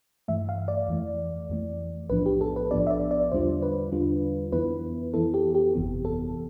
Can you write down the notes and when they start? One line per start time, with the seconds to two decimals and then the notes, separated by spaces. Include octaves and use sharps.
0.28 G2 E3 A3 E5
0.49 F5
0.68 D5
0.88 F2 E3 A3
1.50 F2 E3 A3
2.10 B1 A2 F3 B3 D4 B4
2.26 G4
2.41 A4
2.56 B4
2.71 B1 A2 F3 B3 D4 D5
2.87 E5
2.90 D5
3.11 D5
3.32 E2 D3 G3 D4 F4 C5
3.62 B4
3.92 E2 D3 G3 D4 F4
4.52 F2 E3 B3 E4 B4
5.14 F2 E3 B3 E4 A4
5.34 G4
5.55 G4
5.75 G1 F2 C3 E3 B3
6.05 A4